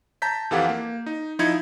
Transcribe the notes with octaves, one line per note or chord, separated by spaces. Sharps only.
A5 A#5 G6 B6
F2 E3 G4 A4 F5 F#5
A#3
D#4
F3 D#4 E4 G#6 C#7